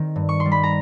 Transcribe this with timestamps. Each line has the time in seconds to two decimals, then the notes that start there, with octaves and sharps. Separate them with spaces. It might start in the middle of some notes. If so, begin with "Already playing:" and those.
Already playing: D#3 C4
0.16 G2
0.29 C#6
0.40 C6
0.46 G3
0.52 B5
0.63 A#5